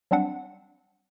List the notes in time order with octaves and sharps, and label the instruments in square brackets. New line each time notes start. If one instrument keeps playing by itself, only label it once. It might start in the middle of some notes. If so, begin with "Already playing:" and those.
[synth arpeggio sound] F#3 G3 C4 D4 F#5